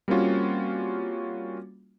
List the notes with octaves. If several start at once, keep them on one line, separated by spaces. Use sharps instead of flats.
G3 A#3 C4 C#4 F4 F#4